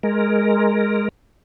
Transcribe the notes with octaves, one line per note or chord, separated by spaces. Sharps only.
G#3 A#4